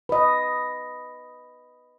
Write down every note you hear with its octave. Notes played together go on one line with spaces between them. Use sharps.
B4 D#5